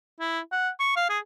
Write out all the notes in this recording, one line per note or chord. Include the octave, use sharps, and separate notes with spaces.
E4
F#5
C#6
F5
G#4